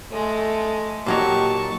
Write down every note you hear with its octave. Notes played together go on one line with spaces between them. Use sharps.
G#3 A3
A#2 F#3 D#4 G4 A5 C#6